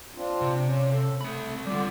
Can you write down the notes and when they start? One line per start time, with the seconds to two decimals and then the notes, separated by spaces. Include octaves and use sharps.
0.16 C4 D4 F4
0.41 C3
0.66 C#4
0.91 A4
1.21 A3 C4 B5
1.66 D3 G3 F4 D5